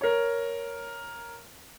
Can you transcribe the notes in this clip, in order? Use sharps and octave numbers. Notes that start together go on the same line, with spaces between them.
A#4 C#5